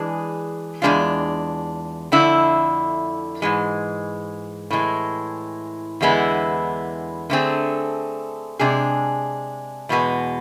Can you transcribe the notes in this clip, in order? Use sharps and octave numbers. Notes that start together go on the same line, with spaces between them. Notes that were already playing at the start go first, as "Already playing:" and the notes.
Already playing: E3 G#3 D4 G#4
E2 B2 G#3 D4 F4
F2 D3 A3 E4
G#2 E3 G#3
A2 E3 G#3
E2 D3 G#3 B3 E4
D3 A3 C4 G#4
C3 G#3 D4 G#4
E2 B2 G#3 B3